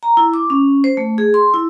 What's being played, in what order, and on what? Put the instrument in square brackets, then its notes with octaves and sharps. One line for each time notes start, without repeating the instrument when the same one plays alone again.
[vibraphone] A#5
E4
D6
C#4
C5
A3
G#4
C6
E4